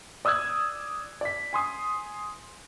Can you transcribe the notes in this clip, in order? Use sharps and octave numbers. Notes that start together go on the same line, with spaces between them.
D5 D#6 E6 F#6 G#6
D5 B6
G#5 C6 D#6